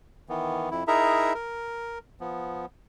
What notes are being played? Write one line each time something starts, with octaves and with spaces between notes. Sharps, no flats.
D#3 E3 B3
F2 E4
D#4 E4 G#4 A#4 E5 A#5
A#4
F3 B3